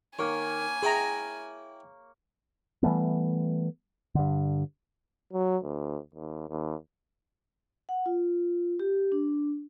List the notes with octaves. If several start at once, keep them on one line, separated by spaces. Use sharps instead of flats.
D#3 A#3 C#5 G#5
E4 G#4 G5 A#5 B5
E3 G3 A3 B3
G2 D3
F#3
D2
D#2
D#2
F#5
F4
G4
D4